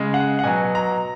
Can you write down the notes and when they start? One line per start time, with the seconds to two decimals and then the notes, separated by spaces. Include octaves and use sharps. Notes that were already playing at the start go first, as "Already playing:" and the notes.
Already playing: C#3 G#3
0.14 F#5
0.39 F#5
0.44 B2 F#3 G#5
0.75 A#5